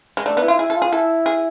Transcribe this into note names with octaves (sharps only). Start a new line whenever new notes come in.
G#3
A3 D4
B3
E4
F4
E4 G#4
A4
F4
G#4
E4 A4
G#4